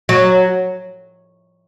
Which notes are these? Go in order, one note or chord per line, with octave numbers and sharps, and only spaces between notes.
F#3